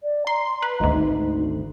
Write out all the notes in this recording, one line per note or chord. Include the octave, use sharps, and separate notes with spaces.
D5
A#5 C6
B4
G#1 D2 D#5
D#4